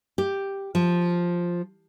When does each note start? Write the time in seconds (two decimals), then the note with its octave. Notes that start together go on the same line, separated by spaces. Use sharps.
0.18 G4
0.75 F3